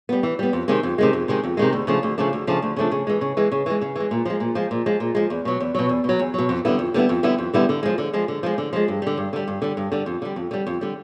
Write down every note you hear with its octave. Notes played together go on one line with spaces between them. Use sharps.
G3 B3
E3
G3 B3
F2
C3 D#3 G#3
F2
C3 D#3 G#3
F2
C3 D#3 G#3
F2
C3 D#3 G#3
D2
C#3 F3 A3 D4
D2
C#3 F3 A3 D4
D2
C#3 F3 A3 D4
D2
C#3 F3 A3 D4
C#3
E3 G#3
C#3
E3 G#3
C#3
E3 G#3
C#3
E3 G#3
A#2
F3 G#3
A#2
F3 G#3
A#2
F3 G#3
A#2
F3 G#3
E2
B2 F#3
E2
B2 F#3
E2
B2 F#3
E2
B2 F#3
F2
D3 G3 B3 E4
F2
D3 G3 B3 E4
F2
D3 G3 B3 E4
F2
D3 G3 B3 E4
D3
F3 G#3
D3
F3 G#3
D3
F3 G#3
D3
F3 G#3
G2
D3 G3
G2
D3 G3
G2
D3 G3
G2
D3 G3
F2
D3 G3
F2
D3 G3
F2
D3 G3